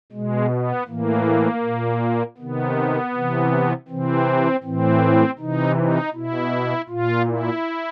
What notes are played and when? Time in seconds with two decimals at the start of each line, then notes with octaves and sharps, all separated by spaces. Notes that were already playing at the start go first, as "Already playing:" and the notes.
0.12 B2 G#3
0.50 B3
0.87 A2 E3 A#3
1.62 A#2
2.38 C3 D#3 B3
3.13 C3 E3
3.88 C3 E3 C4
4.63 A2 E3 C4
5.38 C3 E3 D#4
5.76 D#4
6.14 B2 E4
6.88 A#2 F4
7.26 E4